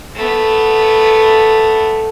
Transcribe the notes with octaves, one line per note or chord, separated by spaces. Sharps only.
A3 B3